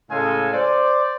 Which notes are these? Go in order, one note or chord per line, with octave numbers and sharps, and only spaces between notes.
A2 C#3 G#3 A4 F5 G#5
C5 D5